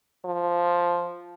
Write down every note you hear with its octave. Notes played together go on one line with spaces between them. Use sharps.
F3